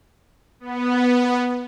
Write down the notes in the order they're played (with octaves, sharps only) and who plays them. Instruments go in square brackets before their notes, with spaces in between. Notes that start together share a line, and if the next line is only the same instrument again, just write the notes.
[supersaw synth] B3